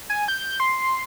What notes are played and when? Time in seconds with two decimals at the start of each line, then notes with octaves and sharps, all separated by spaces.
0.10 G#5
0.28 G6
0.60 C6